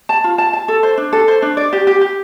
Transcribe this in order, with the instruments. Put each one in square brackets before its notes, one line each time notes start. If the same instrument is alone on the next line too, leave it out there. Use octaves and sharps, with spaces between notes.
[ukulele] A5
F4
A5
A5
A4
C5
D4
A4
C5
D4
D5
G4
G4
G4